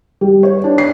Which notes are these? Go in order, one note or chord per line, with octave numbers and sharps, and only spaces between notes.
G3
C#5
D4
C7